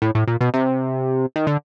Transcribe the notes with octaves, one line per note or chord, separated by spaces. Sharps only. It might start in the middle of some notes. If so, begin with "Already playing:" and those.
A2
A2
A#2
B2
C3
D#3
D3